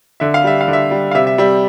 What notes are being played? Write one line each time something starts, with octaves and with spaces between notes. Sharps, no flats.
D3 E5
F5
G3 E5
F5
D3
E5
G3
F5
C3 E5
E5
G3 E5